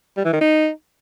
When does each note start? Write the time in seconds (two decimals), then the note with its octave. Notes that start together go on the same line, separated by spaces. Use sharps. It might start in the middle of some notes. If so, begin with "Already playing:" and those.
0.17 G3
0.25 E3
0.33 D#3
0.41 D#4